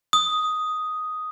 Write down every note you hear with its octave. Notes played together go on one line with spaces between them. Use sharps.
D#6